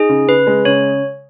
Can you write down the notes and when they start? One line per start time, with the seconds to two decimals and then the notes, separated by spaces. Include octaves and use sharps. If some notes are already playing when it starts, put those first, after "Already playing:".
Already playing: D#4 G#4
0.09 C#3
0.28 C#3 B4
0.47 G#3
0.65 C#3 C#5